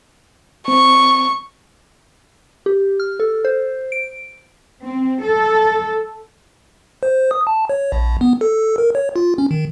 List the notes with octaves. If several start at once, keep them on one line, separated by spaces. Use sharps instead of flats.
C4 C#6
G4
F6
A4
C5
D7
C4
A4
C5
D#6
A5
C#5
A#1
B3
A4
A#4
C#5
F4
C#4
D#3